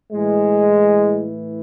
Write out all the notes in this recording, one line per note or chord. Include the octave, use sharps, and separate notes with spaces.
A2 E3 G#3